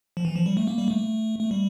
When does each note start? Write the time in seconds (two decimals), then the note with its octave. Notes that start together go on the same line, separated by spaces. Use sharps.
0.17 F3
0.25 E3
0.36 F3
0.46 G3
0.57 A3
0.68 A#3
0.78 G3
0.88 A3
1.40 A3
1.51 G3